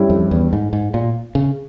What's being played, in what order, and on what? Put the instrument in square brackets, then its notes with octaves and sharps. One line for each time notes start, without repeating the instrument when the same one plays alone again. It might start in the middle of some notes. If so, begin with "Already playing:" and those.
Already playing: [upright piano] G2 G3 C#4 E4
[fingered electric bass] F2
E2
G#2
G#2
A#2
C#3